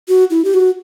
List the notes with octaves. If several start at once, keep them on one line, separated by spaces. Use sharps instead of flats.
F#4
E4
G4
F#4